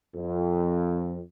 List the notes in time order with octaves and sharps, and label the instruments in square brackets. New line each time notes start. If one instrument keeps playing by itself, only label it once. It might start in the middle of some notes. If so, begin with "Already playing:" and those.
[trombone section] F2